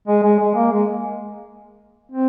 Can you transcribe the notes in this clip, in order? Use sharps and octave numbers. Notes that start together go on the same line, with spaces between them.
G#3
G#3
G#3
A#3
G#3
C4